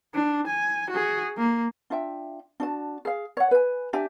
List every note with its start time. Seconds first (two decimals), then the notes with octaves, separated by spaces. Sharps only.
0.15 D4
0.47 G#5
0.91 F#4 G#4
1.38 A#3
1.90 D4 F4 E5 G5
2.60 D4 F#4 A5
3.05 G#4 F5
3.37 C#5 F#5
3.51 B4 G#5
3.93 D4 G4 E5 G#5